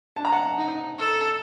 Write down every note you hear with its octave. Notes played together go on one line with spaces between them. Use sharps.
D4 A5
A#5
F#5 A5
D#4
A4